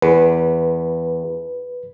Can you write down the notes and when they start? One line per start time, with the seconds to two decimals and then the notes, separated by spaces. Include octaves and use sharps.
0.02 E2 B4